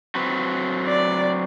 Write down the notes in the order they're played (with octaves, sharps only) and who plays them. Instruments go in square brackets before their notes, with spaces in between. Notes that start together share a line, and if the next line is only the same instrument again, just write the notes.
[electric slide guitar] F#3 C4 B4
[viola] D5